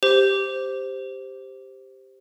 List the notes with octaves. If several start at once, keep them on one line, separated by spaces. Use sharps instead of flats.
G4 C5